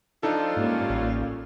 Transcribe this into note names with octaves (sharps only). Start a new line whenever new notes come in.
F3 D4 D#4 F4 A4
G#2 G3 A#3 C#4
A1